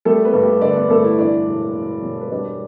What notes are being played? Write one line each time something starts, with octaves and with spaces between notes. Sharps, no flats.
G3 A3 A4
B3 B4
G2
G4
D3 D4 D5
B3 B4
G2 A3 A4
E4
E3 D4 D5
E1
E2
E1
B4
G3 D4 D5